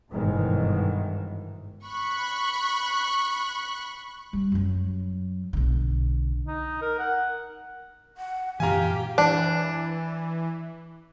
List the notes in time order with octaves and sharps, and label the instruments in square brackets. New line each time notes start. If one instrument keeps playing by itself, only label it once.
[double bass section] G1 G#2 B2 D#3 E3 G#3
[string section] B5 C#6 F#6
[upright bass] G3
F#2 F#3
B1 D3
[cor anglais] D#4
A#4
F#5
[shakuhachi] F#5
[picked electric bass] F#2 A#2 E3 [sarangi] G4 [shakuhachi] F5 [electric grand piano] G#5 A#5
[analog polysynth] E3 [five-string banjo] D4